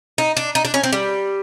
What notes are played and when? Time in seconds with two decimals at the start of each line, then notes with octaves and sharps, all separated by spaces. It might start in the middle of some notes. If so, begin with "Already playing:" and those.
0.18 D#4
0.37 D4
0.55 D#4
0.65 D4
0.74 C#4
0.83 C4
0.93 G3